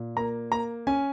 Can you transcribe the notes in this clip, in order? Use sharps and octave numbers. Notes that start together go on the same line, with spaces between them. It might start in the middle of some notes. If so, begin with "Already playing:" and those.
Already playing: A#2
A#3 A#5
A#3 A#5
C#4 G#5